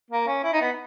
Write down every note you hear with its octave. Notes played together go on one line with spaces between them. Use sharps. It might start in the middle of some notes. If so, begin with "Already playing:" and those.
A#3
C#4
E4
D#4
B3